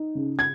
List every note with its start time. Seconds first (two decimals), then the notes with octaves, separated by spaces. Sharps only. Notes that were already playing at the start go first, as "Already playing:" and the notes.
Already playing: D#4
0.15 C#3
0.39 G#6